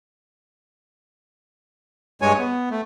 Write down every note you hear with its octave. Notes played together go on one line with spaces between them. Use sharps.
G2 G#3 C#5 G#5
B3
A3